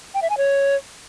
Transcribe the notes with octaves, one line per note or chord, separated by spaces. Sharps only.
G5
E5
G#5
C#5